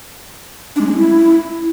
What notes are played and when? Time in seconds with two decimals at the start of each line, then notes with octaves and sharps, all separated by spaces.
0.76 D4
0.81 G#3
0.86 C#4
0.91 G#3
0.96 E4